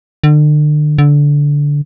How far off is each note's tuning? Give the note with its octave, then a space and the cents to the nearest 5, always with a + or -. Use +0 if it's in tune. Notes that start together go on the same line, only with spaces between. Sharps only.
D3 +35
D3 -15